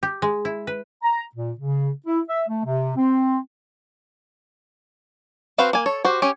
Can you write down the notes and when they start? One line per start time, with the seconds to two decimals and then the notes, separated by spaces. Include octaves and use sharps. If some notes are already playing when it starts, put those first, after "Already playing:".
0.03 G4
0.22 G#3
0.45 E4
0.67 B4
1.02 A#5
1.34 A#2
1.57 C#3
2.05 E4
2.27 E5
2.47 A3
2.64 C3
2.95 C4
5.58 C4 F#4 B4 C5 F5
5.73 A#3 G#5
5.86 A4 C#5
6.05 F#4 G4 C5
6.22 C#4 G4 G#5